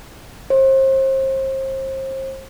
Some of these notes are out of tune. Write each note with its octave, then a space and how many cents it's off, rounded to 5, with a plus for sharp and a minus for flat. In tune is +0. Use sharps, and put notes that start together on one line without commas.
C5 +35